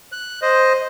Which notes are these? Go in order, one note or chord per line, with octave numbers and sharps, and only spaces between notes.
F#6
C5 D#5